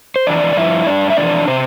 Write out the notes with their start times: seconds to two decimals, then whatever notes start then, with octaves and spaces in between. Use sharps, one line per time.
0.16 C5
0.27 F2 E3 D4 D5
0.53 D5
0.56 G2 F3 E4 E5
0.86 G2 F3 D4 D5
1.10 E5
1.17 F2 E3 D4 D5
1.47 C3 C5